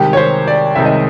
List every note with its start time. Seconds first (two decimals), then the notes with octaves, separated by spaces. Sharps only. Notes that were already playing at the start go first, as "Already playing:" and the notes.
Already playing: C2 C3 D#3 G#3 G4
0.13 C#5
0.17 C5
0.48 D5
0.75 C2 C3 D#3 G#3 E5
0.85 D#5